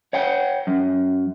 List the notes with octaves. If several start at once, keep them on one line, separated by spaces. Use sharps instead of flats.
C#5 F#5 G5
F#2